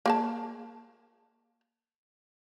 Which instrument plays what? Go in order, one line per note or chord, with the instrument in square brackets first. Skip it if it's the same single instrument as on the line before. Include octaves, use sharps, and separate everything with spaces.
[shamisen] A#3 G#4 A5